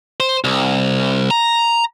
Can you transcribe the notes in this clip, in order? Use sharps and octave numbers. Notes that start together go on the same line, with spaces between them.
C5
C2
A#5